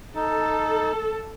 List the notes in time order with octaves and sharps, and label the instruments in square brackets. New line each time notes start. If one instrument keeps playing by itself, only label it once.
[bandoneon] D#4 [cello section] A4